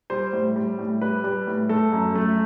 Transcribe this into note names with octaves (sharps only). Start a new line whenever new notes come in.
G3 C5
A2
G3
A2
G3 B4
G3
A2
A3 A4
F#2
A3